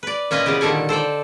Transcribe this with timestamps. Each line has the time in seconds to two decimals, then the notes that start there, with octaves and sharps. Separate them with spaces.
0.03 B4 D5
0.31 A#2 C#4 F4 B4 D#5
0.46 C#3 E3 B3 G4
0.61 A#2 D3 D#3 G3 A4 G#5
0.89 A4 C5 D5 G5